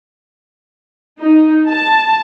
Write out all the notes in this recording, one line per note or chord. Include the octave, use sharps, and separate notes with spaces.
D#4
A5